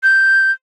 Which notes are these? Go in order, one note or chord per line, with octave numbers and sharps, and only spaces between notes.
G6